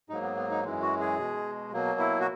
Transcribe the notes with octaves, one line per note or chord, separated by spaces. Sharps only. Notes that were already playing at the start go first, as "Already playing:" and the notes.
G#2 F#3 A#3 D#4
B3
B3
D#4
F#2 E3 G#3
F#4
G#4
B2 G#3
B2 F#3 A#3
E4
F#4